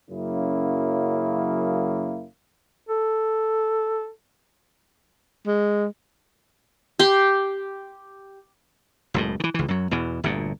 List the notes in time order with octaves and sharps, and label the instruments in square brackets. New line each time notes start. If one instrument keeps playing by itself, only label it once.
[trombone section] F#2 C#3 F#3 A#3 E4
[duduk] A4
[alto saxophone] G#3
[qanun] G4 C6
[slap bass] F#1 C#2 A2
D#3 E3
C#2 E3
F#2 F#3
E2 B2 E3
G1 D2 A#2